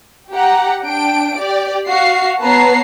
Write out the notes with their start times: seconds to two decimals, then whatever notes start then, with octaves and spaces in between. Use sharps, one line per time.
0.32 G4 F#5 A#5
0.85 D4 G5 D7
1.38 G4 D5
1.89 F#4 F5 C7
2.44 B3 B4 C#5 A5 A#5 C7